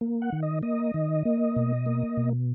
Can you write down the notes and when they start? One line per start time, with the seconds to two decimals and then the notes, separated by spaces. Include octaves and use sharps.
0.01 A#3
0.22 F#5
0.32 D#3
0.43 D#5
0.62 A#3 D#5
0.94 D#3
1.25 A#3
1.56 B2
1.86 A#3
2.17 B2